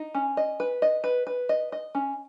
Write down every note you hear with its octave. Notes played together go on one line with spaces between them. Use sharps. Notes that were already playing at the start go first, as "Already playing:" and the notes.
Already playing: D#4
C#4
D#5
B4
D#5
B4
B4
D#5
D#5
C#4